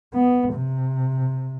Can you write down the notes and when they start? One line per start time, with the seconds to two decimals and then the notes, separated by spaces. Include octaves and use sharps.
0.14 B3
0.54 C3